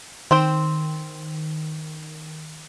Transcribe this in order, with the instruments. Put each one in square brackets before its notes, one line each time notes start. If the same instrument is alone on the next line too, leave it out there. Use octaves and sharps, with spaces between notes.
[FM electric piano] D#3 [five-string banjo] C4 C5 G5